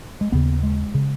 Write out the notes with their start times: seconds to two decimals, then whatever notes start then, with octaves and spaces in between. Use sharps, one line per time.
0.21 G#3
0.32 D#2 C#3 B3
0.63 G#3
0.95 C#3